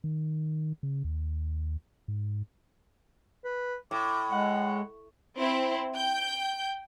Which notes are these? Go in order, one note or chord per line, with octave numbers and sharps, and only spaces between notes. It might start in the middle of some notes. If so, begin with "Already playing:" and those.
D#3
C#3
D#2
G#2
B4
A2 D6
G#3 F#5
C4 E4
G5 G6